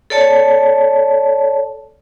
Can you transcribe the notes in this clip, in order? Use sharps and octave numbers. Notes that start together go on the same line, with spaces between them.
A4 C#5 D5 A5